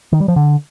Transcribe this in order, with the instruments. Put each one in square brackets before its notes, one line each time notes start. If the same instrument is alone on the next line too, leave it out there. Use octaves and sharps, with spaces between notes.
[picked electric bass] D#3
G3
F3
D3